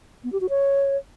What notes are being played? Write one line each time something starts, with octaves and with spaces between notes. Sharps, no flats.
B3
G4
F#4
C#5